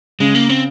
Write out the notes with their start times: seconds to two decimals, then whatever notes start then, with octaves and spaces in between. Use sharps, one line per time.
0.20 C#3 G#3
0.35 A#3
0.49 C4